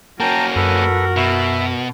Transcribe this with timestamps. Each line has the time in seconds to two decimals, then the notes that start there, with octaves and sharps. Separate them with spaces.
0.20 A#3 C#4 F#4 A#4 G5 A5 A#5
0.56 F#2 A4 B4
1.16 B2 E5 B5